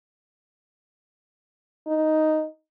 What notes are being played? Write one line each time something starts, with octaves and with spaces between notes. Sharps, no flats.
D#4